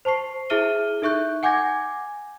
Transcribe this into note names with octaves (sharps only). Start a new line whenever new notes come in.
C5 A5 C#6 C7
E4 G#4 E5 F6 D#7 G7
D#4 A4 E5 C#6 F#6 G6
F#5 G#5 D6 G6 G#6 A#6